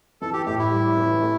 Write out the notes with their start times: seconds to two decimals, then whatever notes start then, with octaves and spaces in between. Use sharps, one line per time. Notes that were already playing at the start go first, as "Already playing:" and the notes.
0.21 E3 A4
0.33 G4
0.46 A2 G4
0.59 E4
0.72 G3
0.97 E3
1.21 A3